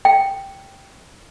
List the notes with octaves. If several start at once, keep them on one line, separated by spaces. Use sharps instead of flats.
G5